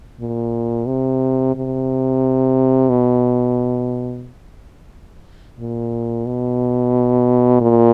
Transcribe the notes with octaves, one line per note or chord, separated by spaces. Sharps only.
A#2
C3
C3
B2
A#2
B2
A#2